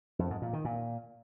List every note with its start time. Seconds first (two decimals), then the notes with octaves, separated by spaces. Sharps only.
0.19 F2
0.30 G#2
0.42 A#2
0.53 D#3
0.65 A#2